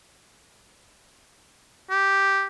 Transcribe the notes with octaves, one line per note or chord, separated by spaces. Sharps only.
G4